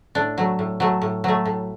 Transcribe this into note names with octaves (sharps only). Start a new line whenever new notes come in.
A2 D4
F#3 A3
A2
F#3 A3
A2
F#3 A3
A2